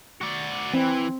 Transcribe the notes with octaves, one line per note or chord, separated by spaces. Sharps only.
F#4 D5
E3 C4